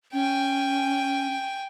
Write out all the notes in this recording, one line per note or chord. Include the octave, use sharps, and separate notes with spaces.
C#4 G5 G#5